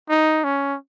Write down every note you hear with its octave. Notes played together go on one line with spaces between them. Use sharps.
D#4
C#4